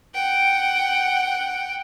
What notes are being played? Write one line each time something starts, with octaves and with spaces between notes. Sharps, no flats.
F#5 G5